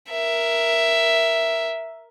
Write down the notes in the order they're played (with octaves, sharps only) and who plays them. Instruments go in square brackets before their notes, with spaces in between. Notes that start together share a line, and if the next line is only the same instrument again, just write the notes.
[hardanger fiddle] A#4 E5